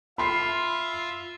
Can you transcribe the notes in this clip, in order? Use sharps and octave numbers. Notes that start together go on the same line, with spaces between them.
F4 E5 B5 C6 C7